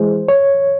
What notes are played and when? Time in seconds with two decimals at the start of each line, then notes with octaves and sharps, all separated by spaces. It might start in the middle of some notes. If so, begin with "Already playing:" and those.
Already playing: E3 G#3 C5
0.28 C#5